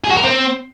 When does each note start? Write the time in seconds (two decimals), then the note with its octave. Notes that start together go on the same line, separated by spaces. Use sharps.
0.04 G#4
0.11 F#4
0.17 A#4
0.23 C4